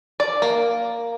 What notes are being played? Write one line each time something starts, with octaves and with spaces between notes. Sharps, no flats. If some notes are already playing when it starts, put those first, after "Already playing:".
D5
A#3